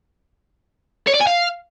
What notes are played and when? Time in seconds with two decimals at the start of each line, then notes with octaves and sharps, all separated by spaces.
1.07 C#5
1.14 D5
1.20 G#5
1.27 F5